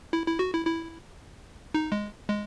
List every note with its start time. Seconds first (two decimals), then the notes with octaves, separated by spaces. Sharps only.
0.13 E4
0.26 E4
0.39 F#4
0.53 E4
0.66 E4
1.74 D#4
1.92 G#3
2.29 G#3